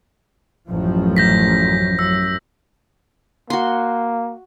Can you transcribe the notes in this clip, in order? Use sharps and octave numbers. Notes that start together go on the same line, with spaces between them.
A1 F#2 F3
G6 A#6 B6
F#2 E6
A#3 F#4 C6